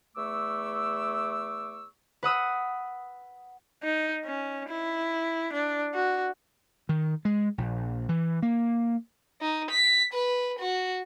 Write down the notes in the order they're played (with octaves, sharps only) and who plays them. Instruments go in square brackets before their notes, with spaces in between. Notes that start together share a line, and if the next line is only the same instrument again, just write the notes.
[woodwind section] E2 A3 C#6 D6 E6
[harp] B4 F#5 D#6 E6
[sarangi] D#4
C#4
E4
D4
F#4
[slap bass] D#3
G#3
A#1
E3
A#3
[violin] D#4
B6
B4
F#4